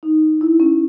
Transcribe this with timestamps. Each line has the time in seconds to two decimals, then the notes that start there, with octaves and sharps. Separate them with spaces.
0.03 D#4
0.41 E4
0.60 C#4